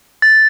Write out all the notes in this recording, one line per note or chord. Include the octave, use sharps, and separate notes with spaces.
A6